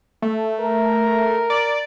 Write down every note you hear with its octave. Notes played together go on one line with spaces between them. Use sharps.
A3
A#4
D5